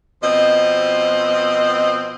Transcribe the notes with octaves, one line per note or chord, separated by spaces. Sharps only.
B2 F3 C4 D#5